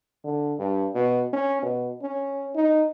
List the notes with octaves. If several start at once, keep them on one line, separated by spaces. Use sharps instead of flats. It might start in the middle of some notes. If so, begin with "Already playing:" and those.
D3
G2
B2
C#4
B2
C#4
D#4